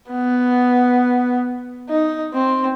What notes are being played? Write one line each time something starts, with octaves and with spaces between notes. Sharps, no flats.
B3
D#4
C4